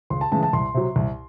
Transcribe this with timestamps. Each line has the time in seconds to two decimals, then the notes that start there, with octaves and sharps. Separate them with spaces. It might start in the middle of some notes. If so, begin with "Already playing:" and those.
0.10 C#2 C6
0.21 A5
0.32 C#3 E3 G#3 A5
0.43 A5
0.53 C2 C6
0.74 C3 F#3
0.96 C2